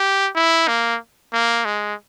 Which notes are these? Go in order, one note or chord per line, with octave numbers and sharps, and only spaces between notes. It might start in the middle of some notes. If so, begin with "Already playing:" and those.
Already playing: G4
E4
A#3
A#3
G#3